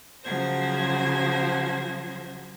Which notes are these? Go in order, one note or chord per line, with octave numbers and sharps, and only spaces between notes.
C#3 F3 F#3 C5 G#6 A#6